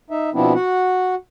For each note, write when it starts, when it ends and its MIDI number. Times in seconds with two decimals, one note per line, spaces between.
0.10 0.30 63
0.10 0.30 76
0.34 0.53 47
0.34 0.53 53
0.34 0.53 59
0.34 0.53 60
0.34 0.53 62
0.34 0.53 64
0.55 1.15 66
0.55 1.15 78